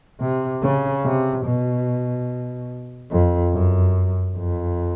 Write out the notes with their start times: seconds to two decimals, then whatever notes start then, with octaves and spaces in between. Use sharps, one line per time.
0.20 C3
0.62 C#3
1.04 C3
1.45 B2
3.11 F2
3.53 F#2
4.36 F2